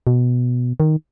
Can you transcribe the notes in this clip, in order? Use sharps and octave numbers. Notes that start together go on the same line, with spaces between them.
B2
D#3